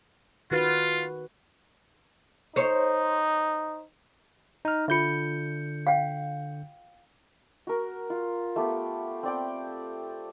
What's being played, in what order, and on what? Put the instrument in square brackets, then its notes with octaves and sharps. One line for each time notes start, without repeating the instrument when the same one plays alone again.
[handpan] D#3 F#4 B4 [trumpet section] F4
[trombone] D#4 [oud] C5 C#5
[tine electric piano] D#4 F6
[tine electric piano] D3 G6 C#7 [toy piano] F4 E5
[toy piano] F5 G5
[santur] F#4 A#4
F4
A3 B3 G4
C4 D5 G5